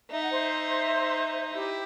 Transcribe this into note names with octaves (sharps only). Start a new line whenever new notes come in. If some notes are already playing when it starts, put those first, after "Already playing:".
D#4 E5
F#5
C5 E5
E4 G4